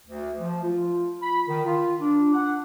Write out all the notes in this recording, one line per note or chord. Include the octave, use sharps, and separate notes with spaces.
D2
F3
F4
B5
D#3
F4
D4
F#5